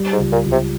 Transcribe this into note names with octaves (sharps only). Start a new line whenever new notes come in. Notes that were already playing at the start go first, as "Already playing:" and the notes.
Already playing: G3
G#2
C#2
A#2
C#2
C3